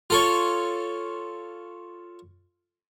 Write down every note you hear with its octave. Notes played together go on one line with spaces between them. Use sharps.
F4 A4 C#5